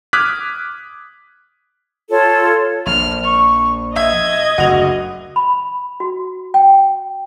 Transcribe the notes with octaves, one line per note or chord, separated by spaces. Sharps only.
D6 D#6 F6 F#6 G#6 B6
F4 A4 C#5
A#1 F6
C#6
D#5 E5 G#6
F#1 D2 F#4 F7
B5
F#4
G5